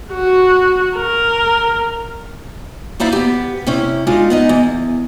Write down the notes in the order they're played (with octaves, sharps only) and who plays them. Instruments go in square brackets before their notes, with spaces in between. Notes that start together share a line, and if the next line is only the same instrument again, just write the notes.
[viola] F#4
A#4
[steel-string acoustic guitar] A#3 D#4 E4 D5 F5
B3 G4
C3 C#4 E4
G#3 D4 D#4 F4
B3 D#4 D#5
E2